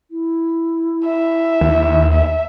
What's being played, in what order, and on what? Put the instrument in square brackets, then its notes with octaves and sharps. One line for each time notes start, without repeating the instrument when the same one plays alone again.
[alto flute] E4
[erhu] E5
[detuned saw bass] D#2
[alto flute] D#5 [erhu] E5